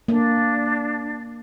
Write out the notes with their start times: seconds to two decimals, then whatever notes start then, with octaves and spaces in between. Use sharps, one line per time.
0.08 A#3 D4